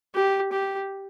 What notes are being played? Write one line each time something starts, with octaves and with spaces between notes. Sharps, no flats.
G4
G4